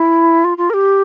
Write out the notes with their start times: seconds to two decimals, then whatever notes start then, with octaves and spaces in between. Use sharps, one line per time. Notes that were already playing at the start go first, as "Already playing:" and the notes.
Already playing: E4
0.44 F4
0.58 F4
0.70 A#4
0.74 G4